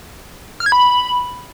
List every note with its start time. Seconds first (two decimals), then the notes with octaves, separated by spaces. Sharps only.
0.60 F6
0.66 G#6
0.72 B5